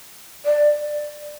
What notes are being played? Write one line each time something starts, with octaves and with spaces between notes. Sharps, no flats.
D5